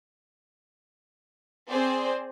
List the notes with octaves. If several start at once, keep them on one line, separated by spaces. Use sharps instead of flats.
C4 G#4 C5 D5